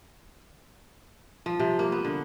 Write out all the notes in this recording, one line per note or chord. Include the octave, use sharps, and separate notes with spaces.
F3
C3
A#3
B3
D3